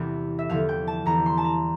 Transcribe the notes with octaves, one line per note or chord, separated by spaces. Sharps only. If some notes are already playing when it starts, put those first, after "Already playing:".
Already playing: E2 C3 E3 G3
E5
E2 D3 F3 F5
G5
A5
E2 E3 G3 A#5
C6
A5
A#5